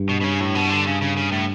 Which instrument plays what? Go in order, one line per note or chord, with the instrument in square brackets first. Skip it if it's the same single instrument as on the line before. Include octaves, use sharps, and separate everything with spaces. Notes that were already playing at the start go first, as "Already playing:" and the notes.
Already playing: [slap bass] G2
[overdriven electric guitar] B2
B2
C#3
A2
B2
D3
C#3
C#3
C#3
A2